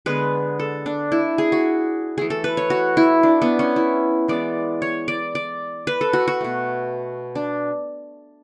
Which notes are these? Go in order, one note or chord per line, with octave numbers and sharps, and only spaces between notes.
D3 G#3 B3 B4
A4
D4
E4
G#4
F#4
E3 A3 G#4
A4
B4
C#5
F#4
E4
D4
B3
C#4
E4
E3 G#3 B3 D5
C#5
D5
D5
B4
A4
F#4
F#4
B2 A3
D4